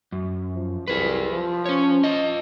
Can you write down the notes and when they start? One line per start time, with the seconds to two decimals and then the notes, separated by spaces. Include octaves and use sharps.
0.12 F#2
0.55 F3
0.88 C2 G#4 B4
1.33 F3
1.66 C#4 C#5
2.04 F4 D#5